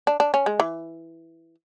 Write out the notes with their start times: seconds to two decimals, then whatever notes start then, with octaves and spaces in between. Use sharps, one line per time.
0.07 D4
0.20 D4
0.34 C#4
0.46 G#3
0.60 E3